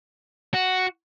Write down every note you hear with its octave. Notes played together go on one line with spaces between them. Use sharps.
F#4